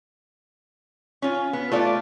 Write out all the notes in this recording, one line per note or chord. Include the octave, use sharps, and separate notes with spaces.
C#4 F4
B3
A3 F4 D5